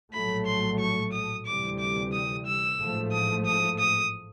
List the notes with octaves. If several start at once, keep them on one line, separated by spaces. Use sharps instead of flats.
A#1 A2 F#3 A3 B5
C6
C#6
D#6
D2 C3 E3 G3 D6
D6
D#6
E6
A1 G#2 F3 A3
D#6
D#6
D#6